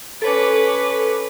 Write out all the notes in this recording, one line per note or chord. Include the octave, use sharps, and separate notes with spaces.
C#4 A4 B4 D6